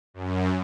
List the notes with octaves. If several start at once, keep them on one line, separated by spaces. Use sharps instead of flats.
F#2